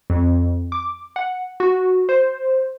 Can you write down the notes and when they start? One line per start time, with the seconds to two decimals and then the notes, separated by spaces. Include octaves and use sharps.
0.10 F2
0.72 D6
1.16 F#5
1.60 F#4
2.09 C5